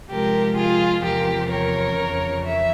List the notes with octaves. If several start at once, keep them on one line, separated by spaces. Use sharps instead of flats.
C3 F3 G#3 G4 A#4
F4 G#4
E2 C3 F3 G4 A#4
A#4 C#5
F2 C#3 E3
E5